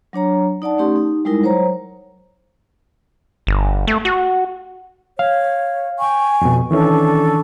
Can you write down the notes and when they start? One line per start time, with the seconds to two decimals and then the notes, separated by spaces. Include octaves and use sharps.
0.13 F#3 D4 C#5 A#5
0.62 D#4 D5 F#5 A5
0.78 A3 C#4 D#4 G4 C6
0.96 D#4
1.25 G3 G#3 D#4 E4 A#4
1.43 F#3 C5 C#5 A#5
3.47 G1
3.87 A3
4.05 F#4
5.19 C#5 F5
5.98 G5 G#5 C#6
6.41 F2 B2
6.71 D#3 E3 C#4 D4 A4 C#6